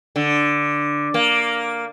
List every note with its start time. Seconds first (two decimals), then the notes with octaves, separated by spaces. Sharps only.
0.16 D3
1.14 A#3